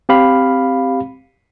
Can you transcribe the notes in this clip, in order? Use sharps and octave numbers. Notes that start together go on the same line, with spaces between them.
C4 G4 F5 B5